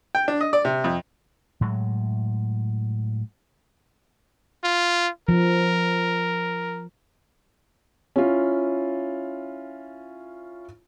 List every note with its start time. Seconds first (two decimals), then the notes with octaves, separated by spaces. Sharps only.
0.15 G5
0.28 D4
0.41 D#5
0.53 D5
0.65 C3
0.84 F2
1.61 A2 F#3 G#3
4.64 F4
5.29 F3 A#4
8.16 C#4 E4 F4